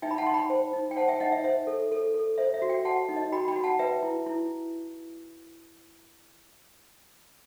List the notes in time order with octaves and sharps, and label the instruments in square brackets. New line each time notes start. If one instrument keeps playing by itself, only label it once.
[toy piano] D#4 E5 G5
B5
F#5 A5
D#4 C6
G5 B5
C5
D#4
G5
C5 F#5 A5
E5 G5
D#4 D#5 F#5
E5
C5 E5
A4
A4
A4
C5 E5
E5
F#4
E5 G5
F#4 F#5 A5
D#4
D#5
F#4 G5 B5
G5 B5
F#4
F#5 A5
B4 E5 G5
E4
E4